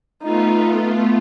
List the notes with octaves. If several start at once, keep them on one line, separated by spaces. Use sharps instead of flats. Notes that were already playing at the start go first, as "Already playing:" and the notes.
A3 B3 D#4 F4